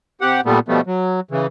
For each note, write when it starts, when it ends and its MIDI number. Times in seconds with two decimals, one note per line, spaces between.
0.21 0.41 48
0.21 0.41 67
0.21 0.41 78
0.45 0.59 46
0.45 0.59 55
0.45 0.59 57
0.45 0.59 59
0.68 0.81 47
0.68 0.81 53
0.68 0.81 55
0.68 0.81 57
0.68 0.81 59
0.87 1.20 54
1.31 1.47 49
1.31 1.47 52